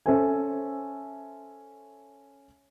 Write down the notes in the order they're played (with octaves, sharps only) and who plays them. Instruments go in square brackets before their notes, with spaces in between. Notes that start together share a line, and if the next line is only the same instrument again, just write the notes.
[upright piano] C#4 A4 C5 E5 G#5